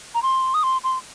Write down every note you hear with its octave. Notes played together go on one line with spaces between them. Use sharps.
A#5
C6
D#6
C6
C6